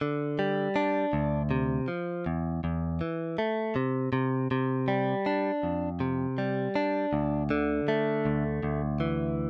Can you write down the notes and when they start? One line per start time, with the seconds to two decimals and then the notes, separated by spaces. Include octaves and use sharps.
0.01 D3
0.39 G3
0.76 D4
1.13 D2
1.51 C3
1.88 F3
2.26 E2
2.64 E2
3.01 E3
3.38 A3
3.76 C3
4.13 C3
4.51 C3
4.88 G3
5.26 D4
5.63 F2
6.00 C3
6.38 G3
6.76 D4
7.13 D2
7.50 D3
7.88 A3
8.26 D2
8.63 D2
9.00 E3